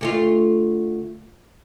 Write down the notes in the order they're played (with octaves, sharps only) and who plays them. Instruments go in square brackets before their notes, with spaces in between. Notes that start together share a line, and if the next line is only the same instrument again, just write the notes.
[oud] D2 A3 F4